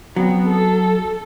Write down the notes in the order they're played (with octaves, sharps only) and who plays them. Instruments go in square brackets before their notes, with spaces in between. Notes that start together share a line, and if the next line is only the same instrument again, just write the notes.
[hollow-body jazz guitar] F#3 [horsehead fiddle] B3 C4
[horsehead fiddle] A4